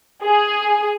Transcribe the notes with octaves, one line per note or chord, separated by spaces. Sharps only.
G#4